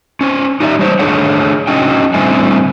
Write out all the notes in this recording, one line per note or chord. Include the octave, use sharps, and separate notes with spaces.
C#4 C5
D#4 G4 D5 E5
G3 C5 C#5
A3 D4 G#4 C#5 F#5
F#3 C#4 D#4 G5
A2 D3 G3 C4 E5 G#5